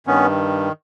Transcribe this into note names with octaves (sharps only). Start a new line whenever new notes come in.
G2 D#3 B3 C#4